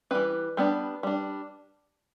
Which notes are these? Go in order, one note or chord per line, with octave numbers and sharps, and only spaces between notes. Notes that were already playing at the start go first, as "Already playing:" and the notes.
E3 G3 C4 B4
G3 B3 D4
G3 D4